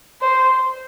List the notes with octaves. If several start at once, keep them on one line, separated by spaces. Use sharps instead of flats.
C5